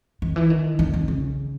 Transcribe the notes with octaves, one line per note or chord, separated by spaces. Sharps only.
D#3
E3
D#3
D#3
D#3
C#3